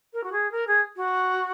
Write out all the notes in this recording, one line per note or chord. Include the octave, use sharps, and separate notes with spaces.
A#4
F#4
G#4
A#4
G#4
F#4